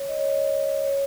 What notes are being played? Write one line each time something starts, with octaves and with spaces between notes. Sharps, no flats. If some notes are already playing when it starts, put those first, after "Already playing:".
Already playing: C#5
D#5
C#5
D#5
C#5